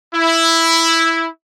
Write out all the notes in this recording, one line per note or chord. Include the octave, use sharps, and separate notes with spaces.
E4